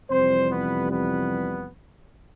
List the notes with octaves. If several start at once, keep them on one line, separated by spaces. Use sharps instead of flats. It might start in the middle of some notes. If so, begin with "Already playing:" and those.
F2 C3 E3 G3 C4 C5
B3 B4
B3 B4